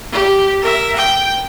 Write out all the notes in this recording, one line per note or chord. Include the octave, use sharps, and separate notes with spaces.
G4
A#4 E5
G5